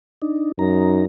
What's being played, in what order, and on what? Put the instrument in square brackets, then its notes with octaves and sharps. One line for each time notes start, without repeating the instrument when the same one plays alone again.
[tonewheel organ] D4 D#4
[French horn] F#2 [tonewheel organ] D#4 A#5